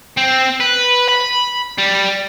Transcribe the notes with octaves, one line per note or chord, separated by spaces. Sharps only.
C4
B4
B5
G3